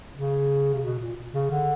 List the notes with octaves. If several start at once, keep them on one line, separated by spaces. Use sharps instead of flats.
C#3
C3
B2
A#2
C#3
D3